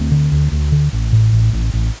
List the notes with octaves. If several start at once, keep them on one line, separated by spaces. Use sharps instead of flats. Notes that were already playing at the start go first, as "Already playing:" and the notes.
Already playing: D2 A3 C4
D3
D2
D2
D3
A1
A2
A1
A1
A1